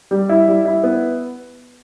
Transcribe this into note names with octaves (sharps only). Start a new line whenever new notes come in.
G3
E4
G3
E4
B3